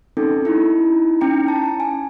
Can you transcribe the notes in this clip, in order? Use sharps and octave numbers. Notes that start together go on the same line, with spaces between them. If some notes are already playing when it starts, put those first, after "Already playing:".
C4 C#4 D#4 A4
D#4 E4
C#4 G5 A#5 C#7
A5
G#5